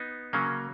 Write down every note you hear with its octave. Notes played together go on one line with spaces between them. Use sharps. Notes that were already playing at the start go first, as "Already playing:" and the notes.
Already playing: B3 D#4
C#3 F#3 A#3 C#4